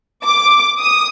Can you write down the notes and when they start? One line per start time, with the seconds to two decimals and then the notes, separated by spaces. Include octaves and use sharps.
0.25 D6
0.80 D#6